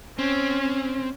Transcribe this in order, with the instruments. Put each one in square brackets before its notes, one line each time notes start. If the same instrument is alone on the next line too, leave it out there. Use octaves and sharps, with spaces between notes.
[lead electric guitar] C4 [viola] C#4